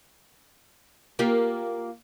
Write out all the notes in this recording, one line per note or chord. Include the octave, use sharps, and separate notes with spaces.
A#3 F4 G4